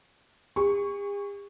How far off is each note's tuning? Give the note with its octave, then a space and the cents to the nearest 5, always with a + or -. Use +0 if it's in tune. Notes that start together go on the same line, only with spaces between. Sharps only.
G#4 -45 C#6 +0